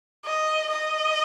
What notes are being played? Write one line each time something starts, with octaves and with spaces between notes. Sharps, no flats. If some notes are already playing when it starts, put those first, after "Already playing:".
D#5
D#5